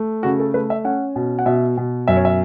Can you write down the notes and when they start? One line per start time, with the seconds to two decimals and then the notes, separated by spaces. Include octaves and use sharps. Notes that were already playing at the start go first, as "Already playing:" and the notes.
Already playing: A3
0.23 C#3 F#4
0.40 A4
0.54 A3 B4
0.70 E5
0.84 C#4 F#5
1.16 B2
1.39 F#5
1.46 B2 E5
1.78 B2
2.08 F#2 E5
2.17 C#5
2.25 E5